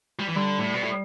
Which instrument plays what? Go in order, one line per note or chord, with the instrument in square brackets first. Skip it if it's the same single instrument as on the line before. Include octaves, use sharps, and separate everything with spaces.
[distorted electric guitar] G3
E3
[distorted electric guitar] D3 [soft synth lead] G3
[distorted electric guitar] A2
B2
A2